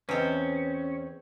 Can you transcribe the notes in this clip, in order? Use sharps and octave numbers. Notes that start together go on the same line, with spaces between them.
E2 C4 C#4 B4 D#5